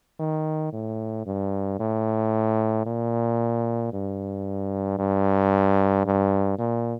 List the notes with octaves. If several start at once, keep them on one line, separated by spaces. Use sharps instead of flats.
D#3
A2
G2
A2
A#2
G2
G2
G2
A#2